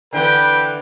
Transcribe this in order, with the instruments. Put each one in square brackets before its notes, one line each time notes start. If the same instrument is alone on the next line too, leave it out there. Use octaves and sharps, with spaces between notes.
[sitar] D3 E3 B3 [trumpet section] B4 G5